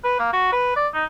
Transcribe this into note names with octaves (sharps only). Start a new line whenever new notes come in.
B4
A#3
F#4
B4
D5
D#4